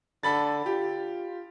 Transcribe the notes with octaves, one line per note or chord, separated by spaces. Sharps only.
D3 A4 B5 A6
F4 G4